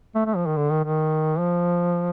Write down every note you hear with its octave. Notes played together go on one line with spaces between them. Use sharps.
A3
A3
F3
D#3
D3
D#3
D#3
F3